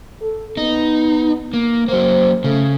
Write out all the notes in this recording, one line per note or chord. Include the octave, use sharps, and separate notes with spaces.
A4
B3 D#4
A#3
F#3 A#3 C5
C#3 A3